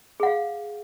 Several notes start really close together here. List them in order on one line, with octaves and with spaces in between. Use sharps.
G#4 F#5 F5